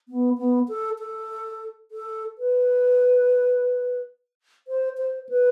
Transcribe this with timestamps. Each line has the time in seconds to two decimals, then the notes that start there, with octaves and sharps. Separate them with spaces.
0.08 B3
0.38 B3
0.68 A4
0.99 A4
1.91 A4
2.38 B4
4.68 C5
4.98 C5
5.29 B4